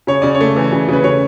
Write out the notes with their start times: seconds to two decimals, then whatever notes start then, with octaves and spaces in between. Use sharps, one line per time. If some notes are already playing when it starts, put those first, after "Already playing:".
0.07 C#3 C#5
0.22 C#3 D5
0.35 C#5
0.41 A3
0.56 E3
0.72 C#3
0.88 C#3 B4
1.04 C#3 C#5